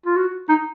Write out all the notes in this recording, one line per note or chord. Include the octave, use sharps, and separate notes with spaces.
F4
F#4
D#4